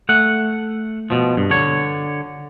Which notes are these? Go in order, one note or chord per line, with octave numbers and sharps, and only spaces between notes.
A3 F#5
B2 F3
G2
D3 C#5